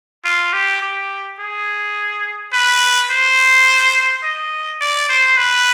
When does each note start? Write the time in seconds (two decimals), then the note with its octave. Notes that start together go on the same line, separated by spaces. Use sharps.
0.25 F4
0.53 G4
0.82 G4
1.39 G#4
2.53 B4
3.10 C5
4.23 D#5
4.81 D5
5.09 C5
5.37 B4